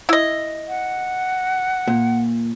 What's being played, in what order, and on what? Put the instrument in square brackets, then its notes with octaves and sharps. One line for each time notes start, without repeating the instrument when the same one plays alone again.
[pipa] E4 D#5
[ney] F#5
[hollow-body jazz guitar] A#2